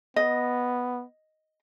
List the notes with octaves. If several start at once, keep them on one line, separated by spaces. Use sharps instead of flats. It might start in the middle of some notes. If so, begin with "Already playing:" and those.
B3 D#5